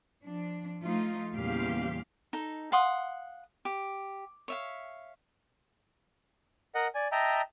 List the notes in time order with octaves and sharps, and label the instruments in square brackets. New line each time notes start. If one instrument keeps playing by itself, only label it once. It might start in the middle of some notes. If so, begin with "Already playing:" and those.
[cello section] F3 D4
F3 A3 D#4 F4
E2 A#2 C#3 G3 G4 F5
[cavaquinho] D#4 A4
F5 F#5 C6 D#6
G4
C#5 E5 F5
[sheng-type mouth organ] A#4 D#5 F#5
D5 G#5
D#5 E5 G5 A5 A#5